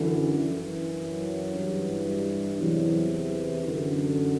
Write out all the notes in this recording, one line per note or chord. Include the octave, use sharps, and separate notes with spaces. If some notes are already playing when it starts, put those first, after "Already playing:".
Already playing: F#2 D3 E3
F#2 E3
F#3
G2 E3
G3
E2 C3 E3 F#3
E3
F#2 D3